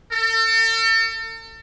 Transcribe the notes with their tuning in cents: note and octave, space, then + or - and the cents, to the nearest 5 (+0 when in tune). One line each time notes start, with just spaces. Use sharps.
A4 +40